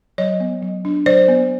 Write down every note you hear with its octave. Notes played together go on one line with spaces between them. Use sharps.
F#3 C#5 D#5
B3
F#3
D4
F#3 C5 D5
B3